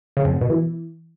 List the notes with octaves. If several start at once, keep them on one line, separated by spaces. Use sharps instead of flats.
C#3
F2
G#2
B2
E3